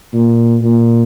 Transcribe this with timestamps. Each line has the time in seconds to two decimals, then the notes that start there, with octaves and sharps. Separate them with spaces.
0.14 A#2
0.62 A#2